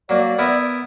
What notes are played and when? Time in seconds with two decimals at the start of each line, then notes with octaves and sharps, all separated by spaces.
0.09 F#3 A#3 D5
0.38 B3 E4 A#4